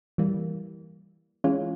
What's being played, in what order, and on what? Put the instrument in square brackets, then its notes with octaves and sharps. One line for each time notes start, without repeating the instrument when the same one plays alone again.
[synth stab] E3 G3 A#3
E3 G#3 C#4 F4